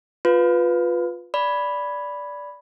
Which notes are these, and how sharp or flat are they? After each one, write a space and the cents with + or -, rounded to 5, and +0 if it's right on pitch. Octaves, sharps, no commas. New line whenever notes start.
F4 +15 B4 +0
D5 -10 B5 +0